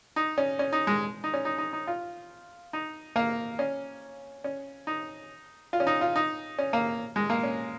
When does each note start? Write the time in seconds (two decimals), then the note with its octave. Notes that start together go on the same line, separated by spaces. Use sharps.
0.16 D#4
0.38 C#4
0.59 C#4
0.73 D#4
0.87 G#3
1.24 D#4
1.34 C#4
1.45 D#4
1.58 D#4
1.73 D#4
1.87 F4
2.73 D#4
3.16 A#3
3.59 C#4
4.44 C#4
4.87 D#4
5.73 F4
5.80 C#4
5.87 D#4
6.01 F4
6.16 D#4
6.59 C#4
6.73 A#3
7.16 G#3
7.30 A#3
7.43 C#4